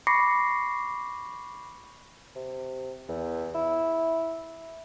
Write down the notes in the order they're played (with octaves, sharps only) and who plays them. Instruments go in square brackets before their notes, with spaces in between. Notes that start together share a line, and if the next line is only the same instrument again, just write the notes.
[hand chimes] B5 C#6 D6 A#6 C7 C#7
[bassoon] C3
E2
E4